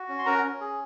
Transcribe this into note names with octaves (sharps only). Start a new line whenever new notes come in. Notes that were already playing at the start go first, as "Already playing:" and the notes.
Already playing: F#4
C#4
C6
C#4 A#4 A#5
C#4
G#4